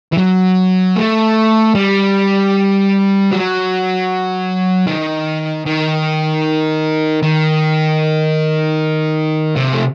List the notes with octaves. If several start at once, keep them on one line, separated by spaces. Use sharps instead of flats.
E3
F#3
A3
G3
F#3
D#3
D#3
D#3
C3
A3